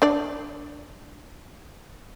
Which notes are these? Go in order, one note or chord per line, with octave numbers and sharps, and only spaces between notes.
D4 D5